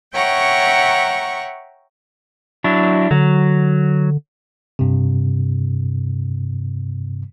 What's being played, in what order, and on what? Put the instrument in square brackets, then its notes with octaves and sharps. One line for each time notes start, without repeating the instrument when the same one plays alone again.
[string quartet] C#5 E5 F#5 G5 A#5 C#6
[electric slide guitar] F#3 D4 E4
[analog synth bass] D3 [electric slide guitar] F#3
[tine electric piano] G2 C3